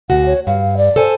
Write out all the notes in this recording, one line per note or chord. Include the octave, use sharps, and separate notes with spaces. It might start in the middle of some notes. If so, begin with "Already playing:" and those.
D2 F#4 F#5
C#5
G2 F5
D5
A4 C5 G#5